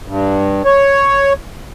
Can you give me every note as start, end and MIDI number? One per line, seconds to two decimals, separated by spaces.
0.08 0.62 43
0.65 1.33 73